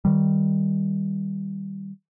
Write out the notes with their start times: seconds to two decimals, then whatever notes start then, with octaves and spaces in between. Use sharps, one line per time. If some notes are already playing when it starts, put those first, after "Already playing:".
0.05 D#3 G3